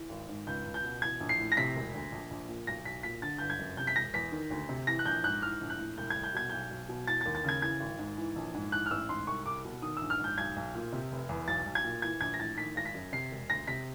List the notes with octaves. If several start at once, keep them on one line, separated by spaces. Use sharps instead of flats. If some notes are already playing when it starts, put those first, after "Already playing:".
Already playing: E3
G#1
G#2
C#2 G6
C#2
G6
B2
E3 G#6
A#1
C7
A2
A#6
C3 B6
E1
D2
A#1
A#1
A#2
B1 A#6
B1 B6
A#2 B6
D3 A6
G1 G6
G#6
F#2
C3 G6
B6
E1 A#6
E2 B6
D#3
D2
C3
E3 A#6
F#6
A#1 G6
G#2 F#6
E3 F6
A#1
F#6
A2
C2 G6
C2 G#6
G6
B2 G#6
B1 G6
B1
B2
E3 A6
D#2 A6
A6
C#3 G#6
E3 G#6
G#1
G#2
E3
A#1
G#2
E3 F#6
F6
A1 E6
G#2 C6
C2 C#6
C2 D6
B2
D#3 D#6
A#1 E6
F6
G#2 G6
B1 G#6
B1
A#2
C3
F1
E2
B1 A6
B1
G#6
A#2
E3 G#6
A#1 G#6
A#6
A2 A6
D#3 B6
G#1 A#6
B6
F#2
C3 C7
E1
D2 A#6
C3 B6